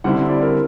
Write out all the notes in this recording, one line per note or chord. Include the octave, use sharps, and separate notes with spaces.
D3 G3 C4 E4 F#5
D5
A#4